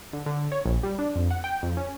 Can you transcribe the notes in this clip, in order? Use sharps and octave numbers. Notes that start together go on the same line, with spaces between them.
D3
D3
C#5
A#1
G3
D4
F2
F#5
G5
F2
C#4